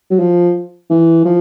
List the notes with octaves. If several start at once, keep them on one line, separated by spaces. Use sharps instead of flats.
F#3
F3
E3
F3